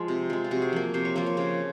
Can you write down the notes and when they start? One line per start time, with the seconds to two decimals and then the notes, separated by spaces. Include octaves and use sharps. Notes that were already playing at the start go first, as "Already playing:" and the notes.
Already playing: F3 G#3 F4
0.08 C3
0.30 F3 G#3
0.44 F4
0.51 C3 F#4
0.62 G#4
0.73 F3 A#3
0.94 C3 C5
1.05 C#5
1.16 F3 A#3 C5
1.26 C#5
1.37 C#3 C5